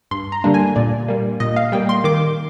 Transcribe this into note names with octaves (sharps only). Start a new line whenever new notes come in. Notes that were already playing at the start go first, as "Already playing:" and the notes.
G2 C6
A#5
D3 G3 A#3 D4
G#5
A#2 D5
G3 A#3
A#2 D#5
F5
G3 A#3 G5
C6
D#3 D6